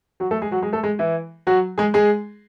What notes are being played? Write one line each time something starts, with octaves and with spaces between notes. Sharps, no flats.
F#3 F#4
A3 A4
G#3 G#4
F#3 F#4
G#3 G#4
A3 A4
G#3 G#4
E3 E4
F#3 F#4
G#3 G#4
G#3 G#4